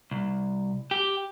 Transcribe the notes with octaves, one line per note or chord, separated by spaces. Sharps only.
C2
G4